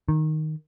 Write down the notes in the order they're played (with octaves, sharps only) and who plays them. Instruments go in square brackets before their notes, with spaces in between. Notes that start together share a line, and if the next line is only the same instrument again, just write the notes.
[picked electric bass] D#3